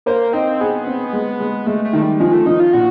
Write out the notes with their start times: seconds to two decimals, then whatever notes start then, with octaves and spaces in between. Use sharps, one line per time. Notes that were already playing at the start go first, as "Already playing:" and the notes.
0.06 A#3 C5
0.33 C4 D#4
0.60 B3 G#4
0.86 C4
1.13 G#3
1.40 G#3
1.67 G#3 A3
1.85 A3
1.93 D#3
2.02 G3
2.20 F3 G#3
2.33 A3
2.46 F3 D#4
2.60 F4
2.73 A#2 F#4